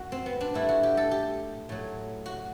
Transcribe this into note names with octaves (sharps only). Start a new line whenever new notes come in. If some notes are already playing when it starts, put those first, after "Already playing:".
Already playing: F#2 F#4
C4
B3
D4
A2 G3 E4
F#4
G4
A4
G4
A2 F#3
F#4